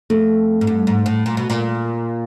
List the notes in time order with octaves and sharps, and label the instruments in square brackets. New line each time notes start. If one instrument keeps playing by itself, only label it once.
[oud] F2 [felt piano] A3 A4
[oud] G#2
G2
G#2
A2
A#2
B2
A#2